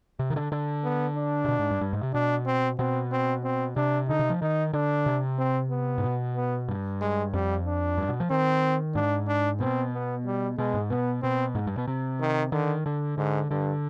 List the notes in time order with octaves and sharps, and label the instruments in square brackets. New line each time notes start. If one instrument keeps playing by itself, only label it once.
[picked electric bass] C3
D#3
D3
D3
[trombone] B3
D4
[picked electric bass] C3
B2
G#2
G2
G2
G#2
C3
[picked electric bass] B2 [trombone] D4
[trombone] C4
[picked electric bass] B2 [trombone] C4
[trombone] C4
C4
[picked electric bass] C3 [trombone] D4
[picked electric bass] D3 [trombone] D#4
[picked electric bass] C3
F3
[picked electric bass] D#3 [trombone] D#4
[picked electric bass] D3 [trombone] D4
[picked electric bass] C3
[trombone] C4
B3
[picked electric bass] G#2
B2
[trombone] B3
[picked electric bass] G2
[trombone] G#3
[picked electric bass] F2 [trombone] G3
[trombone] D4
[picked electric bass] G2
B2
F3
[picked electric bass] D#3 [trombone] C4
[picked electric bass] G#2 [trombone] D4
[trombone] D4
[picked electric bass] B2 [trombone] C4
[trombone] B3
G3
[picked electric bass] B2 [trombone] G#3
[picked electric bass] G#2
[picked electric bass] B2 [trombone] B3
[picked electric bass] B2 [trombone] C4
[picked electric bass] G#2
G2
B2
C3
[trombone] D#3
[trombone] D3 [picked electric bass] D#3
[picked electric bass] D3
[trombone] G#2 [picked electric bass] D3
[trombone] G2 [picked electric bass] D3